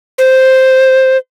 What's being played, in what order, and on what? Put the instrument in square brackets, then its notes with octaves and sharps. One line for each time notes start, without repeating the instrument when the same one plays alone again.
[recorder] C5